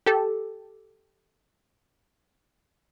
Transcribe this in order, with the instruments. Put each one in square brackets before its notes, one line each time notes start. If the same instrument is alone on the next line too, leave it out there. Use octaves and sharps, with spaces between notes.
[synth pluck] G4 A4